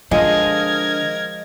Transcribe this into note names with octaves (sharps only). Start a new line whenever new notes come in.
D3 F3 G#3 A#4 D#5 G#6